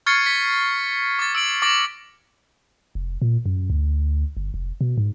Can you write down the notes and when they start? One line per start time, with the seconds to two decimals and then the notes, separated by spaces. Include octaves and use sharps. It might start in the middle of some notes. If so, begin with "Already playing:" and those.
0.06 C#6 F6 G#6 A6 C7 C#7
0.26 B6
1.19 D6 A6
1.35 E6 D7 F#7
1.62 D6 A6 A#6 D7 F#7
2.95 F1
3.22 A#2
3.46 F#2
3.70 D2
4.37 G1
4.54 F1
4.81 B2
4.98 G#2